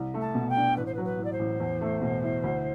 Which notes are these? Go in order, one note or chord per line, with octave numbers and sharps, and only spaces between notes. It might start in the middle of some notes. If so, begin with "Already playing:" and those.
Already playing: C2
A3
A5
B2
G5
D4
A1 B4
C5
B4
F#3
B4
A2
D5
C5
A1
E2
A3
B2
E4
D2